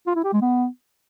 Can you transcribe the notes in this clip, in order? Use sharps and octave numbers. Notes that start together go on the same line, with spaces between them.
F4
E4
G4
G#3
B3